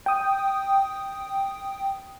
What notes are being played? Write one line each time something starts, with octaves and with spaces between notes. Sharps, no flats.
G5 D#6